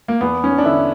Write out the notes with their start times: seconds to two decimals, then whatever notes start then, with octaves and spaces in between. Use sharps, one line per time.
0.08 A#3
0.21 E2 B3
0.44 C#4
0.58 D4
0.65 D3 E4